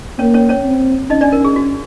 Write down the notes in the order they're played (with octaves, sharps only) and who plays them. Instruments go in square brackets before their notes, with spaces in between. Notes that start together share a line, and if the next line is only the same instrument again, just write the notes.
[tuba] A#3 [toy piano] C#4 C#5
[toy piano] C#4 C#5
C#4 C#5
[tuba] C4
[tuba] C#4 [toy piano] D#4 D#5
[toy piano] D4 D5
A#4
G#4
F#4